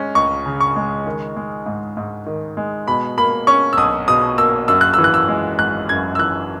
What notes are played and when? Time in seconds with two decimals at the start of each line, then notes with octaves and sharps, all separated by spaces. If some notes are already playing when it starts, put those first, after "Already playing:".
Already playing: G#3 C#4
0.15 C#2 C#6
0.46 C#3
0.60 C#6
0.76 G#3
1.06 D#3
1.36 G#3
1.66 G#2
1.97 G#2
2.26 D#3
2.57 G#3
2.87 B2 B5
3.17 A#3 B5
3.47 C#4 C#6
3.73 E6
3.77 B1 D#6
4.08 B2 D#6
4.38 A#3 E6
4.68 F#2 E6
4.81 F#6
4.94 E3 E6
5.04 F#6
5.14 E6
5.29 G#3
5.59 G#1 F#6
5.89 F#2 G#6
6.15 E6
6.19 E3 F#6